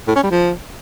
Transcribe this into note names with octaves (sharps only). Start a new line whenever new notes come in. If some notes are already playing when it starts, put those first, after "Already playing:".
A2
C#4
G3
F3